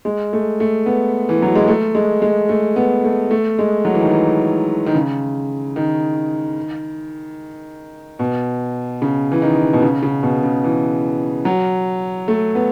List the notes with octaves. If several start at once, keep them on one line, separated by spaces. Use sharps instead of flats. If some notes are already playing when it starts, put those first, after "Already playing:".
G#3
A3
A3
B3
E3
F#3
G#3
A3
G#3
G#3
A3
B3
A3
A3
G#3
F#3
E3
D#3
E3
D#3
C#3
D#3
B2
C#3
E3
D#3
B2
C#3
C#3
B2
C#3
E3
F#3
A3
B3